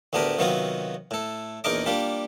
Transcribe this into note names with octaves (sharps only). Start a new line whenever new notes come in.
D2 A2 B3 D4 G4 A#4
C3 D#3 F#3 B3 F4 F#4
A2 A4
A#1 E2 D#4 A#4 D#5 D6
G3 A#3 D4 F4 G4